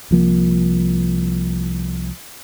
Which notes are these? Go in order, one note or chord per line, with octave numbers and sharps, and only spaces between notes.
C2 F3 A#3